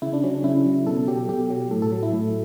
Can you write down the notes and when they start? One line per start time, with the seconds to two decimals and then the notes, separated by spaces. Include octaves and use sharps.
0.02 C#3 E4
0.13 D4
0.24 F#3 C#4
0.34 D4
0.44 C#3 E4
0.65 F#3
0.87 B2 A4
1.08 F#3 G4
1.29 B2 G4
1.50 F#3
1.71 A2 A4
1.82 A4
1.92 F#3
2.03 E4
2.13 A2